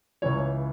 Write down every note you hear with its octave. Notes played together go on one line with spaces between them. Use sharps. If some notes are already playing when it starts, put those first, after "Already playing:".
C#2 C#3 E3 C#5